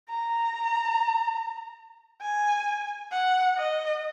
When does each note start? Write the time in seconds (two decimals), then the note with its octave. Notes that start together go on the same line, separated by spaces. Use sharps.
0.09 A#5
2.21 G#5
3.12 F#5
3.57 D#5